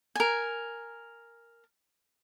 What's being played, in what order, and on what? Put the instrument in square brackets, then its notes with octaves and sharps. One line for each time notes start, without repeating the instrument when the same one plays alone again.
[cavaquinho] A#4 G#5